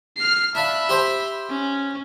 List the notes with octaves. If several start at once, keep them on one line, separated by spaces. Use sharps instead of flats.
F6 C7
D4 E5 F5 B5
G4 C5 G5
C#4